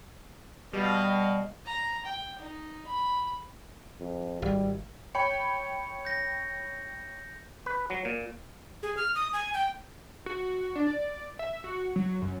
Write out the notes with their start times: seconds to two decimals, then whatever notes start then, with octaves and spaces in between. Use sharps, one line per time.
0.73 B2 G3 D#5 F5
1.66 A#5
2.05 G5
2.39 D#4
2.87 B5
4.01 F2
4.42 G#1 G3
5.15 C#5 G5 B5 C#7
6.05 G6 A#6
7.66 B4
7.90 F#3
8.05 A#2
8.83 G#4
8.97 F6
9.15 D#6
9.33 G#5
9.54 G5
10.26 F#4
10.75 D4
10.87 D5
11.39 E5
11.64 F#4
11.96 F#3
12.22 F#2